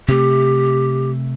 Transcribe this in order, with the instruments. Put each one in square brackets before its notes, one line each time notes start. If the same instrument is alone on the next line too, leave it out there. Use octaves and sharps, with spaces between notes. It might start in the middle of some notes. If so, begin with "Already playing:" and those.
[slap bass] C3 A3 [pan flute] G4